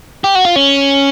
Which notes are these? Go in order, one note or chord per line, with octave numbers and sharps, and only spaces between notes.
G4
F#4
F4
C#4